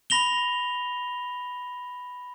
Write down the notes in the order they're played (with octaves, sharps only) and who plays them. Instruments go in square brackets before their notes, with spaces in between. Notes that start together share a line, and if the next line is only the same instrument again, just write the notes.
[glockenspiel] B5 A#6 F7 G7